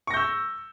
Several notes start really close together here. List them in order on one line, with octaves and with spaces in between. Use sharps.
C#6 A#6 G6 E6